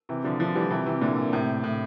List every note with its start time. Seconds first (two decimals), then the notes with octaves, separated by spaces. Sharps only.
0.09 C3 E3
0.24 D3 F3
0.40 D3 F3
0.55 E3 G3
0.71 C3 E3
0.86 C3 E3
1.01 A#2 D3
1.32 A2 C3
1.64 A2